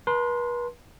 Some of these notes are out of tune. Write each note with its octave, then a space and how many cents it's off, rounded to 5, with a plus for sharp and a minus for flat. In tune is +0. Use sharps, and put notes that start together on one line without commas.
B4 -40 A5 +0 C6 +0